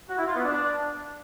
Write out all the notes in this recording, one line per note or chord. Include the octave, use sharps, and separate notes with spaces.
F#4
E4
F4
B3
D4